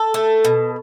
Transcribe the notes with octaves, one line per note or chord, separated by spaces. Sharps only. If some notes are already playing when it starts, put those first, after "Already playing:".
Already playing: A4
A3
B2